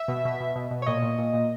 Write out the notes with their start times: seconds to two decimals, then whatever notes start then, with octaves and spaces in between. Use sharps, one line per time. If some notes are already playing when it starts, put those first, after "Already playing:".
Already playing: E5
0.08 B2
0.25 B2
0.40 B2
0.56 B2
0.71 B2
0.82 C#5
0.86 A#2 D#5
1.02 A#2
1.19 A#2
1.33 A#2